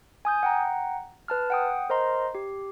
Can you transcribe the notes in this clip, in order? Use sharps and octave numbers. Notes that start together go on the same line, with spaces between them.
G#5 D#6 G6
F#5 G5 A#5
B4 A5 F6
F#5 G5 D#6
A#4 C5 D#5 A#5 C6
G4